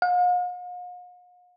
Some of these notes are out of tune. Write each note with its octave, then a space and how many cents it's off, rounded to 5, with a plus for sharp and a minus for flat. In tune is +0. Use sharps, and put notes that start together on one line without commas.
F5 +45